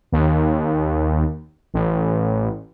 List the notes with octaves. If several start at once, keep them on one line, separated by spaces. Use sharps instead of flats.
D#2
A1